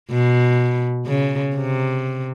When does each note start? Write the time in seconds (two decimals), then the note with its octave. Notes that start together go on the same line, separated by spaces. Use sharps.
0.10 B2
1.06 C#3
1.55 C3